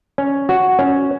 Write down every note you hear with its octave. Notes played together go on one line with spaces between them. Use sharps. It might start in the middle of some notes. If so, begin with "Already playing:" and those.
C#4
F#4
C#4